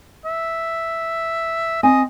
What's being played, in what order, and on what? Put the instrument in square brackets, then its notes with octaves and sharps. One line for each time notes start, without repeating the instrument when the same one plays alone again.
[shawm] E5
[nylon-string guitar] C4 G#5 [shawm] D#5